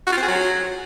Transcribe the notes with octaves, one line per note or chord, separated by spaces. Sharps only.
F#4
F4
C4
G#4
F#3